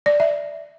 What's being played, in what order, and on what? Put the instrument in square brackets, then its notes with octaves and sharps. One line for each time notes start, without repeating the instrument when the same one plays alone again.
[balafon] D5
E5